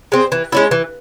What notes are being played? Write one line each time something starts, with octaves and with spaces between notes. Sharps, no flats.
G#3 C4
E3
G#3 C#4 E4
E3